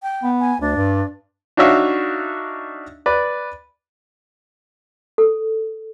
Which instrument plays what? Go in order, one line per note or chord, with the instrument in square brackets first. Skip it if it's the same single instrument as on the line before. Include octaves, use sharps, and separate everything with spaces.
[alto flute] G5
[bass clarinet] B3
[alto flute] G#5
[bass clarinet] D2 [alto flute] D4
[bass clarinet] G2
[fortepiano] D4 D#4 F#4 C#5 E5 F5
B4 D5
[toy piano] A4